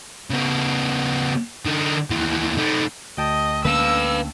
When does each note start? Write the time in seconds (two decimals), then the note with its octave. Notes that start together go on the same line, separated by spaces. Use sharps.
0.30 C#3 B3
1.66 D3 D#4
2.10 D#2 E3
2.58 A3 D#4
3.17 D2 D#5 G5 A5
3.65 D3 A#3 C#4 B4 F5 E6